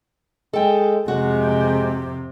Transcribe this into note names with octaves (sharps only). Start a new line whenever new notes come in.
G#3 A4 G5
F2 C3 G#3 F#4